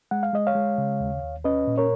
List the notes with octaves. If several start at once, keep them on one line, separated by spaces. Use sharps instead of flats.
G#3 F#5
F5
G#3 D#5
C#5 F5
G#3
C#3
D#2
D#2
C#4 B4 D#5
A#2
A#4 C#5